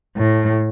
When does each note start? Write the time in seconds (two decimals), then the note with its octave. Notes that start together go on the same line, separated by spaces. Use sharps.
0.17 A2